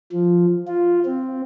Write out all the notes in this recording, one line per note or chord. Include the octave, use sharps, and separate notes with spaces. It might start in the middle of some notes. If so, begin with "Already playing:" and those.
F3
F4
C4